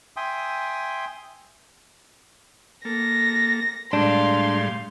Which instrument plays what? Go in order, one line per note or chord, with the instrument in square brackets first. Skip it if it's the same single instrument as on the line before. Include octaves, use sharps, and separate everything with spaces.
[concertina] E5 G5 G#5 C6 D#6
[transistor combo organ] A#3 A4 [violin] A#6
[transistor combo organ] A2 G3 G#3 [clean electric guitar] D4 [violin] F5 C6